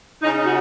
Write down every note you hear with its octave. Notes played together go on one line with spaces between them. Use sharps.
C#3 D#4
D#4
F#4